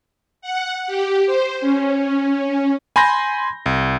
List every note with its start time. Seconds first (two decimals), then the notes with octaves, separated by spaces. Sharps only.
0.42 F#5
0.87 G4
1.27 C5
1.61 C#4
2.96 G#5 B5 C6 G6 A#6
3.66 C2